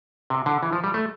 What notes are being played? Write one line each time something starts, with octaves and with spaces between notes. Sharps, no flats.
C3
D3
E3
F3
G3
A3